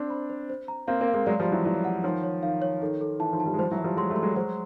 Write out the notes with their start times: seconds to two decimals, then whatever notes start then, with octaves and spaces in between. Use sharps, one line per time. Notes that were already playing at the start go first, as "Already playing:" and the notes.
Already playing: C4 D4 C5
0.10 B5
0.30 C5
0.50 C5
0.68 A#5
0.88 A#3 C4 F5
1.01 A#3 C4
1.08 F5
1.14 G#3 A#3
1.26 F#3 G#3 D5
1.40 F3 G3
1.46 D5
1.52 E3 F#3
1.65 E3 F#3 D5
1.84 F#5
2.04 D#3 F3 C#5
2.23 C#5
2.43 D#3 F5
2.62 C#5
2.81 D#3 A4
3.01 A4
3.20 E3 A5
3.33 D#3 F3
3.40 A5
3.46 F3 G3
3.54 G#3
3.59 F3 G3 C5
3.71 E3 F#3
3.77 E5
3.84 F3 G3
3.97 F#3 G#3 C6
4.10 G3 A3
4.16 C6
4.22 F#3 G#3
4.36 F#3 G#3 C5